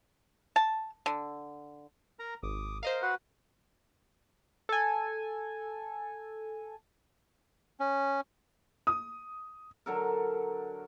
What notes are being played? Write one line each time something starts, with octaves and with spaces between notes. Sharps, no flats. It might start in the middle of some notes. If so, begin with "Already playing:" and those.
A5
D3
A#4 A#5
G#1 D6 D#6
A#4 C5 D#5 F5
F#4 B4 F#5
A4 G#5
C#4
D#6
D3 F#3 A4 A#4